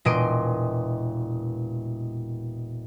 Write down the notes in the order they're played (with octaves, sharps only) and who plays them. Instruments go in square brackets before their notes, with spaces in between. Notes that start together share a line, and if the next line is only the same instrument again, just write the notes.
[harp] E1 A#2 D#5 C6 D7 D#7